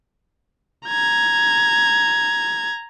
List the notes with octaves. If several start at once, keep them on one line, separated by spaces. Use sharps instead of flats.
A#5 G#6